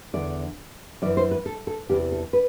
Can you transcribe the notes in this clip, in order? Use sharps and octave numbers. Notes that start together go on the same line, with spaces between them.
E2 D3 D5
F#2 E3 D5
C5
B4
A4
A4
E2 C3 E3 G4
A4
B4